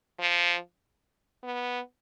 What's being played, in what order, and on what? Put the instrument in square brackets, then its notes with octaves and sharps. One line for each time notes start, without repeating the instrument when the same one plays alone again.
[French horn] F3
B3